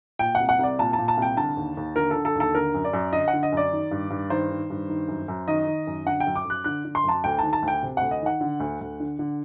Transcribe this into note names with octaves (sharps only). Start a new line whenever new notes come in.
A#2 G5
F#5
C2
F#5
C2 D5
A#2 A5
A5
A#2
A5
C2
G5
D3 A5
D#2
D#2
D3 A#4
A4
D3
A4
D#2
A4
D3 A#4
F#2
D5
F#2
D3 D#5
F#5
D3
D#5
F#2 D5
D#3
G2
G2
D#3 C5
D#3
G2
D#3
F#2
F#2
D#3 D#5
D#3
F#2
D3 F#5
G5
F#2
D6
F#2 F#6
D3 F#6
D3
C6
F#2 A5
D2 G5
D#3 A5
A5
D2
G5
C3
D2 F#5
D#5
D#3 F#5
D3
D2
D2
D3
D3